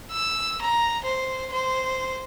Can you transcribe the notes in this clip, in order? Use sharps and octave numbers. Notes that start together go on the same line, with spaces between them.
E6
A#5
C5
C5